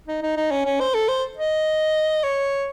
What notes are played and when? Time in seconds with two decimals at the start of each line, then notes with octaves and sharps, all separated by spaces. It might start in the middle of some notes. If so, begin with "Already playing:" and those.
0.08 D#4
0.23 D#4
0.37 D#4
0.51 C#4
0.66 C#4
0.80 C5
0.94 A4
1.08 C5
1.37 D#5
2.23 C#5